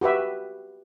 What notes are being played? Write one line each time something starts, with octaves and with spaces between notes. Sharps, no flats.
F#4 G4 B4 E5